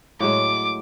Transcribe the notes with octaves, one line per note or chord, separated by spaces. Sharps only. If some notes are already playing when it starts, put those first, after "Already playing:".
A2 F#3 G#3 D6